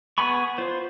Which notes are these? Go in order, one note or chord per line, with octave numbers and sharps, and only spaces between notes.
B3 G#4 G#5 B5 C#6
F4 C5